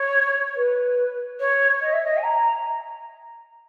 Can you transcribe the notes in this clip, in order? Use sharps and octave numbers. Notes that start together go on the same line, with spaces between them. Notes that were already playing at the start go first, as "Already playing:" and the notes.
Already playing: C#5
B4
C#5
D#5
E5
D#5
G#5
A#5